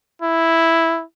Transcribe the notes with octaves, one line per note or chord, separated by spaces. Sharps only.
E4